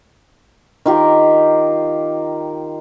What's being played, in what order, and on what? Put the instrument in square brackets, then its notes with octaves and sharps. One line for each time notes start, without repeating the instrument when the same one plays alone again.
[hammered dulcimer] D#3 F4 G4 A#4